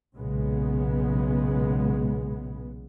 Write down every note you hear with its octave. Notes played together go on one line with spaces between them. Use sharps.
B1 A#2 C#3 G#3 B3